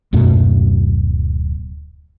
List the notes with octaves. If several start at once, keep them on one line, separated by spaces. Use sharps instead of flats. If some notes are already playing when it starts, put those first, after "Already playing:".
D1 F#2 B2 A3